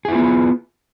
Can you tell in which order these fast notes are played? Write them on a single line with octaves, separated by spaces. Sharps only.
G#4 E4 F4 B3